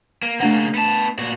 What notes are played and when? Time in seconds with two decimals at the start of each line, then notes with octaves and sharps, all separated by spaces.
0.23 A#3
0.40 C#3 A3 A#3 D4 F#5
0.75 B3 A5
1.18 A#2 F#4